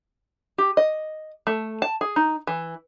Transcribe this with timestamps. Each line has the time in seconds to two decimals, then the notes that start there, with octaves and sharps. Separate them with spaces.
0.58 G4
0.77 D#5
1.47 A3
1.82 A5
2.01 G#4
2.16 D#4
2.47 E3